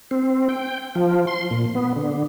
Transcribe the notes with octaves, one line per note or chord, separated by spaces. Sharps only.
C4
G5
F3
C6
A#2
B3
D3